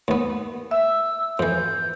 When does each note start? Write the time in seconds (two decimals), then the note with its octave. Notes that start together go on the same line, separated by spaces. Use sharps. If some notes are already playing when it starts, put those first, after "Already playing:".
0.08 D#2 B3
0.71 E5 E6
1.39 F2 E3 G6